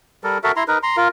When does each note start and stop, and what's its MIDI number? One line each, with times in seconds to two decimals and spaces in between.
0.24 0.38 55
0.24 0.38 69
0.24 0.38 70
0.44 0.52 66
0.44 0.52 69
0.44 0.52 70
0.44 0.52 76
0.56 0.64 64
0.56 0.64 82
0.56 0.64 84
0.68 0.78 63
0.68 0.78 70
0.68 0.78 71
0.83 0.97 82
0.83 0.97 84
0.97 1.08 65
0.97 1.08 70